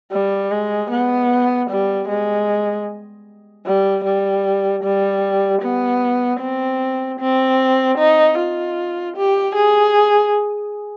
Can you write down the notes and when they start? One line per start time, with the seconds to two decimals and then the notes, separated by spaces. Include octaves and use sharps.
0.12 G3
0.51 G#3
0.90 B3
1.70 G3
2.09 G#3
3.66 G3
4.05 G3
4.84 G3
5.62 B3
6.41 C4
7.20 C4
7.98 D#4
8.38 F4
9.16 G4
9.56 G#4